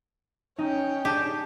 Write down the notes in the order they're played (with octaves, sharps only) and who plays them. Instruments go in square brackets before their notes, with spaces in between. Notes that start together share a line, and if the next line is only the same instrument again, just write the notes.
[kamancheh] C#4 G5 [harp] D#4
[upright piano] D4 [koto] G4 [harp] G#4 A5